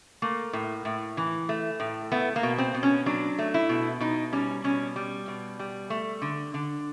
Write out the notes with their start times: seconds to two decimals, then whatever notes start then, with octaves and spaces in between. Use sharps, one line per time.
0.22 A3 A#3
0.53 A2
0.85 A2
1.17 E3
1.49 A3
1.80 A2
2.12 A3 B3
2.36 A#3
2.43 B2
2.58 C4
2.74 B2
2.83 C#4
3.06 F#3 D4
3.39 A3
3.54 E4
3.69 B2
4.00 B2 D#4
4.33 G3 C#4
4.64 B2 C#4
4.96 G3
5.28 B2
5.59 G3
5.90 A3
6.22 D3
6.54 D3